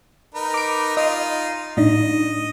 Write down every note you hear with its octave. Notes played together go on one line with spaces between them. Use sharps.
D#4 A#4 B4
D6 D7
D#4 F4 D#5
A2 D4 D#4 D#5